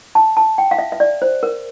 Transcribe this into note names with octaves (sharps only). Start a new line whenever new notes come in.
A5
A5
G5
F5
E5
E5
D5
C5
A#4